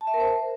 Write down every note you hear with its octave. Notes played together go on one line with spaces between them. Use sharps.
A5
E5
A#4
C5